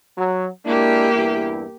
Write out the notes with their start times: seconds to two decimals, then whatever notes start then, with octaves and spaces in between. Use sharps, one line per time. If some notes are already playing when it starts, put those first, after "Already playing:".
0.18 F#3
0.65 G#3 A#3 D4 E4 G4
1.14 E2 G2 E4